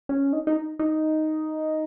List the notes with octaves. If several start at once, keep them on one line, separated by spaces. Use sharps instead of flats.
C#4
D#4
D#4
D#4